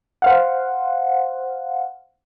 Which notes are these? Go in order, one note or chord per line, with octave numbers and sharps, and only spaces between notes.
C5 F5 F#5